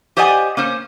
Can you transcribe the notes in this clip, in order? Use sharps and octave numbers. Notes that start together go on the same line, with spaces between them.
G4 C5 D5 D#5 F#5 G#5
A#3 C#4 C5